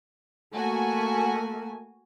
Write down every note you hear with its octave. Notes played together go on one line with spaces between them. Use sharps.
A3 A#3 F#4 G#5